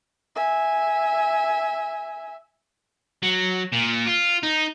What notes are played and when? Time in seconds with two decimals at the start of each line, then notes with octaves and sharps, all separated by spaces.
0.36 E5 G#5
3.23 F#3
3.73 A#2
4.07 F4
4.43 D#4